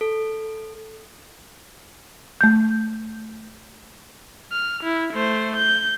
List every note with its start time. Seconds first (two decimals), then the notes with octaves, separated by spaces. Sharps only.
0.01 A4
2.41 A3 G6
4.52 F6
4.84 E4
5.14 A3 C5
5.57 G6